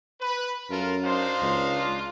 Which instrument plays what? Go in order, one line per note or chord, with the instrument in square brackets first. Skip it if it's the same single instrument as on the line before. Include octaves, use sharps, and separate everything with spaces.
[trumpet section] B4
[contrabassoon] F#2 [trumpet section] F4 A4 A#4
[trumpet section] D4 D#4 F5 [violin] C5 C6
[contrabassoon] C#2
[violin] F4